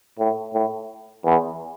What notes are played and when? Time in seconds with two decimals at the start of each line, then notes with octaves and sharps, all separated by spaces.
0.19 A2
0.54 A2
1.24 E2